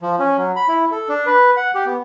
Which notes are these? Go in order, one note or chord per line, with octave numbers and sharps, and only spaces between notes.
F3
C#4
F#3
B5
E4
A4
D4
B4
F#5
G4
B3